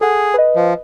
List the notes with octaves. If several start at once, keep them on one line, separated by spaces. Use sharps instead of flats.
G#4 A4 F#5
B4 D#5
F3